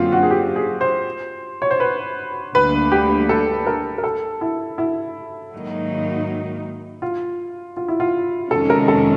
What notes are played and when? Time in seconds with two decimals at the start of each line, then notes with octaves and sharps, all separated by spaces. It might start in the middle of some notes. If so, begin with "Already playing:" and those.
Already playing: F#2 D3 F#3 A#3 C4 F4
0.12 F#4
0.23 G#4
0.31 G4
0.56 G#4
0.81 C5
1.62 C#5
1.71 C5
1.80 B4
2.55 D2 D3 G3 A#3 B4
2.92 G4
3.29 A4
3.67 A#4
3.98 A#4
4.04 A4
4.41 E4
4.78 E4
5.52 G#2 D#3 F#3 A#3 D#4
7.02 F4
7.77 F4
7.88 E4
8.00 F4
8.51 F2 C3 D#3 G#3 C#4 A4
8.70 A#4
8.88 A4